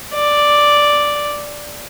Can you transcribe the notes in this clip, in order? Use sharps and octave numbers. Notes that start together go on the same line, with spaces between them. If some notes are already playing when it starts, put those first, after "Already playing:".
D5